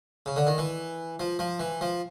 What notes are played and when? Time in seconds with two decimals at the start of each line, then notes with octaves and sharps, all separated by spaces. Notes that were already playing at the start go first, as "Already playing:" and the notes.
0.26 C#3
0.36 D3
0.47 D#3
0.58 E3
1.20 F3
1.39 F3
1.60 E3
1.81 F3